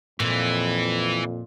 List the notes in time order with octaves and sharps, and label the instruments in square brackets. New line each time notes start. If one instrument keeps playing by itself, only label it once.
[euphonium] F2 [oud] A#2 [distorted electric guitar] E3